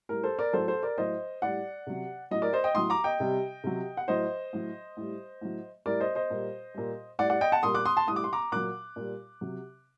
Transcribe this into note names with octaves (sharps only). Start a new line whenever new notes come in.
A2 G3 A#4
A4 C5
A#4 D5
A2 F#3 A4 C5
A4 C5
A#4 D5
A2 F#3 C5 D#5
A2 G3 D5 F#5
C3 F#3
A2 F#3 D#5
A#4 D5
C5 D#5
D#5 G5
A2 F#3 C6 D#6
A#5 D6
D#5 G5
C3 G3
C3 F#3
F#5
A2 F#3 C5 D#5
A2 F#3
A2 G3
A2 F#3
A2 G3 A#4 D5
C5 D#5
C5 D#5
A#2 G3
A#2 G3
A2 G3 D5 F#5
D5 F#5
D#5 G5
F#5 A5
A#2 G3 C6 D#6
D6 F#6
C6 D#6
A5 C6
A2 G3 D#6
D6
C6
A#5 D6
A#2 F#3 D6 F#6
A#2 G3
C3 F#3